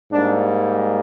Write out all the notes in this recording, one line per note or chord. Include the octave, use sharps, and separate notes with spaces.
G#2 G3 A#3 D4